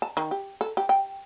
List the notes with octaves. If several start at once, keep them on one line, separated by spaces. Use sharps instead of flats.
A5
D#3
G4
A4
G4
G5